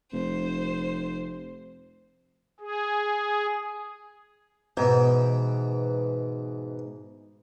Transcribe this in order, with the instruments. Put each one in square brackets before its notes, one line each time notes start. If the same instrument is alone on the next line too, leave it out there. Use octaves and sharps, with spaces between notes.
[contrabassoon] F1 [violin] C5
[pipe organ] G#4
[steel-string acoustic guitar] G#2 [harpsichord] B2 E3